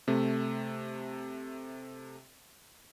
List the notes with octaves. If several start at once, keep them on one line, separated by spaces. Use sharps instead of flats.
C3 A3